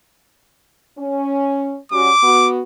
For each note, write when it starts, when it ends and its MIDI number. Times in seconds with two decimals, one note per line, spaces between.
0.98 1.77 61
1.92 2.11 55
1.92 2.11 61
1.92 2.11 66
1.92 2.50 86
2.23 2.60 59
2.23 2.60 66